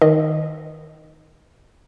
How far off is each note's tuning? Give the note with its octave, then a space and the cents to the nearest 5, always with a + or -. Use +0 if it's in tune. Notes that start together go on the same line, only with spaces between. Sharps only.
D#3 +5 D#5 -10